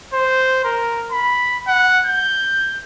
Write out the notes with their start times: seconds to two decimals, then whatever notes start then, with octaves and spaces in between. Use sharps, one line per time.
0.14 C5
0.64 A#4
1.12 B5
1.67 F#5
2.06 G6